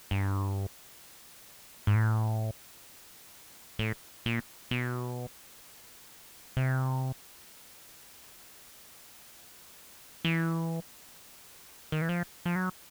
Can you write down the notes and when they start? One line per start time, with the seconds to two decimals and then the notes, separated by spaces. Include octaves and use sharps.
0.11 G2
1.87 G#2
1.95 A2
3.79 A2
4.26 A#2
4.71 B2
6.57 C3
10.25 E3
11.92 D#3
12.02 E3
12.09 F3
12.46 F3
12.56 F#3